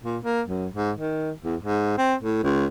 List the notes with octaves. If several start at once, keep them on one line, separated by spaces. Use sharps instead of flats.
A#2
A#3
F#2
G#2
D#3
E2
G#2
C4
A2
C#2